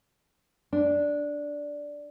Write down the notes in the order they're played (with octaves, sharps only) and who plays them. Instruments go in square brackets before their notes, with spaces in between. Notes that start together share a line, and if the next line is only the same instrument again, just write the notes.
[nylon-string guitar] D4